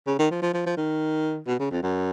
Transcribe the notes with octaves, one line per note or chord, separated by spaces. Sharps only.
C#3
D#3
F3
F3
F3
F3
D#3
B2
C#3
F2
F#2